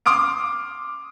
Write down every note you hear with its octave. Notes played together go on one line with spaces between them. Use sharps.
C6 D6 D#6 F6 D7